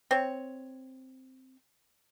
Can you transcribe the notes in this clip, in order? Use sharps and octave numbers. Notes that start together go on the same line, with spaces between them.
C4 C#5